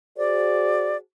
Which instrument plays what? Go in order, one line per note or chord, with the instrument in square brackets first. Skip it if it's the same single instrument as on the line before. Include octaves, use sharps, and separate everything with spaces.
[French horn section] F#4 G#4 C5 [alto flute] D5